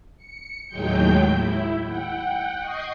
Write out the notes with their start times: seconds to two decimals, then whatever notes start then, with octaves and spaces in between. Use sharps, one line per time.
0.17 C#7
0.68 D#2 A2 F#3 G#3 G5 G6
1.29 E4
1.84 F#5 G5
2.61 D#5 C#6 D#6 G6 C7